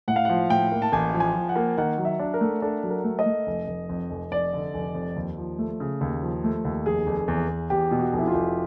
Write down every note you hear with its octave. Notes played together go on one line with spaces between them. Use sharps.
A2 F#5
F5
F3 F#5
A2 G5
A#3
A5
A1 G#5
F3
G#5
F3
F#5
A#3
D#3 F#5
F#3
E5
D4
A#4
A3
D4 A4
F#3
A#4
A3
D#5
A3
F1
F1
F2
F1
F1 D5
D3
F1
F2
D#2
F3
A3
C#3
D#2
F3
A3
D#2
F1 G#4
F1
E2
E2
E2 G4
B2
F#4
F1
E4
F4
F1